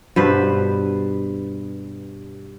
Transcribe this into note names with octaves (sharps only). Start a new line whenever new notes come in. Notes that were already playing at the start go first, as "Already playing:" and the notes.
G2 B2 B4 C5